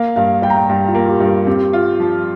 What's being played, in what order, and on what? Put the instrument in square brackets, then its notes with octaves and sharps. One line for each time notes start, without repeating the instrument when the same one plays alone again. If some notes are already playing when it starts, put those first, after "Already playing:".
Already playing: [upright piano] A#3 [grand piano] F5
[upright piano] G2 [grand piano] F5
[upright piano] G3 [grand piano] G5
[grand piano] A#5
G5
[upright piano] G2 [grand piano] G5
[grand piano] F4
[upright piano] A#3
[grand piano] G4
[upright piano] G2
[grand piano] A#4
[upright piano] C4 [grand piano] G4
[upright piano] F4
F3